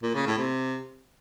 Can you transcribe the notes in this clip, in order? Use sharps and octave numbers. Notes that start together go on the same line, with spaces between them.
A#2
C#3
A2
C3